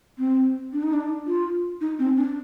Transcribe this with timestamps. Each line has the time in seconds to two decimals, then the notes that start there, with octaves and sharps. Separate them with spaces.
0.19 C4
0.73 D4
0.83 D#4
0.93 D4
1.27 F4
1.81 D#4
1.99 C4
2.17 D4